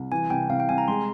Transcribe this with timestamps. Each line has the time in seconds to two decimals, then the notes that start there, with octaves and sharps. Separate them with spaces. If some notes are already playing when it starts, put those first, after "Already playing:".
Already playing: C2
0.12 E3 G#5
0.30 C2 G5
0.49 C2 F5
0.60 G5
0.69 C2 G#5
0.78 A#5
0.88 G#3 C6